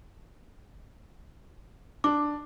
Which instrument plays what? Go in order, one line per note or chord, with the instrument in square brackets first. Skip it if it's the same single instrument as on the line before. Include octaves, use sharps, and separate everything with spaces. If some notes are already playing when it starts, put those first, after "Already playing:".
[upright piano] D4 [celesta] D6